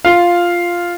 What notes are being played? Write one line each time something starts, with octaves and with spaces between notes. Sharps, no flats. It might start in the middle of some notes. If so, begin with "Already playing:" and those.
F4 F5